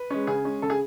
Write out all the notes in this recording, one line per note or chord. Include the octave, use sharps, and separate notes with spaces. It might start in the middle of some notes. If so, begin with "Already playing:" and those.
Already playing: B4
G#3 C#4
C#3 G#4
G#3 C#4
C#3 A4
G#4